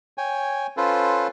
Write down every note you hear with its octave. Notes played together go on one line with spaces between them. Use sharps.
C#5 G5 G#5
C#4 F4 A4 B4 C5